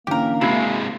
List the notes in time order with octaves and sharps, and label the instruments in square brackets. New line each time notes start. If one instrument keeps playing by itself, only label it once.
[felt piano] D3 E3 C#4 [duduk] A#3 [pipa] G4 A#4
[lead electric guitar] C3 G#3 [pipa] E4 [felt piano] F#4 G#6 C7